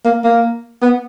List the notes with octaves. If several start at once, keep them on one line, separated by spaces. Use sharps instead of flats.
A#3
A#3
B3